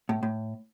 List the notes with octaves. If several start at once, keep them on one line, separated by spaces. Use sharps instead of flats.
A2
A2